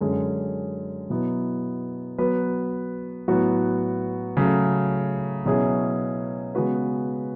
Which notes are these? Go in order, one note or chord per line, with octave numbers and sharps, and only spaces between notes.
F#2 D3 G#3 C#4 G#4
B2 F#3 B3 E4
F#3 B3 F#4 B4
A2 F#3 B3 F#4
C#3 F#3 A3
B2 F#3 C#4 E4 G#4
C#3 G#3 B3 F#4 B4